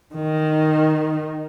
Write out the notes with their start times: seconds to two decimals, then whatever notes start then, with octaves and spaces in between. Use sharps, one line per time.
0.15 D#3